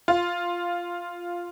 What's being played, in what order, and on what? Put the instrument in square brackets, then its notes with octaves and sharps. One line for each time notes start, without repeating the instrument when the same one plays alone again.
[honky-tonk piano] F4